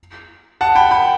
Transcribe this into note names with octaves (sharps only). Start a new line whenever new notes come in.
F#5 A5
G5 B5
G5 B5